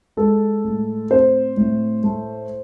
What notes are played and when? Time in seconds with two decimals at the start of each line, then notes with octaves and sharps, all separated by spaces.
0.17 G#3 A4
0.64 A2
1.10 C4 C5
1.57 A2
2.04 A3